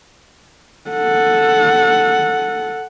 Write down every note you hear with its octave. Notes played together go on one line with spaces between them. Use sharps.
A4 F#5